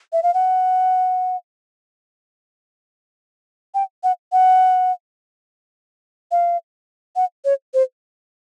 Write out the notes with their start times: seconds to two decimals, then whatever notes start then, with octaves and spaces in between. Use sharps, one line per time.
0.13 E5
0.23 F5
0.34 F#5
3.74 G5
4.03 F#5
4.32 F#5
6.31 F5
7.16 F#5
7.45 C#5
7.74 C5